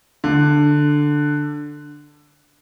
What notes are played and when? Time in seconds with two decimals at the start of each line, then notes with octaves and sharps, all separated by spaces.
0.24 D3